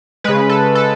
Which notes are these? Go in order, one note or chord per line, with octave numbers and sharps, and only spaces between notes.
C#3 G#3 B4
A4
A4